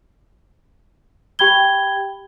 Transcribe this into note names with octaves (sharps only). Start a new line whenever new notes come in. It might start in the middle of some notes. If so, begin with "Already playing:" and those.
G4 G5 B5 G#6 G7